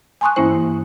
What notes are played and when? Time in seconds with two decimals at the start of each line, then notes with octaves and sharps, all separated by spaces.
0.21 G#5 A5 C6 C#6 D#6 F#6
0.36 G2 E3 A#3 C#4 E4 C5